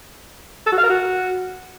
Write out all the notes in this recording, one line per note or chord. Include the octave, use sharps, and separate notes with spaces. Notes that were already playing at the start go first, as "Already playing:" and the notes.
A4
F#4
F5
A#4
F#4